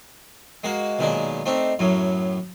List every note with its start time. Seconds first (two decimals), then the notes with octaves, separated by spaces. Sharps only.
0.64 G#3 A#3 F#4
0.99 B1 A#2 D#3 G#3 D4
1.46 A3 C4 D4 D#4
1.79 F#2 A2 F#3